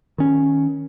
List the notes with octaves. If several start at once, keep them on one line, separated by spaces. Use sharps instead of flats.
D#3 C#4